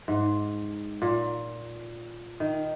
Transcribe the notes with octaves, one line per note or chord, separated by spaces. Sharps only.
G#2
A#2
D#3